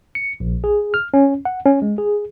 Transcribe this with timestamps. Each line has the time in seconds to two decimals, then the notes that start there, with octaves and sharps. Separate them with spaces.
0.15 C#7
0.40 A#1
0.64 G#4
0.94 F6
1.14 C#4
1.45 F#5
1.66 C#4
1.82 G#3
1.98 G#4